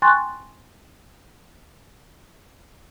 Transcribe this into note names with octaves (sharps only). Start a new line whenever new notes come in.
G5 G#5 C6 C#6 F#6 A6